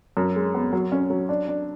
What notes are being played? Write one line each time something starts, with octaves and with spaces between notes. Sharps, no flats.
F#2
G#3
B3
F#3
C#4
F#3
D4
D4